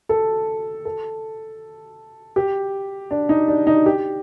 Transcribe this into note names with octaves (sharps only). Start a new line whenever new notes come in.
A4
A4
G4
D4
D#4
D4
D#4
G4